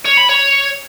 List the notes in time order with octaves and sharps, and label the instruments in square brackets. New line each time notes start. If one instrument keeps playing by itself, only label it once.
[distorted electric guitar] C#5
B5
C#5